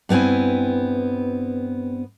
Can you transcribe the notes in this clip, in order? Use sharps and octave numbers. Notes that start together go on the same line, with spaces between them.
G2 B3 C4 E4 G#5